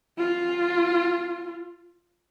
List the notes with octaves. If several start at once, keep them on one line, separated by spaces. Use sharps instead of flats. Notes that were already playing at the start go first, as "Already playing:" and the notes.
F4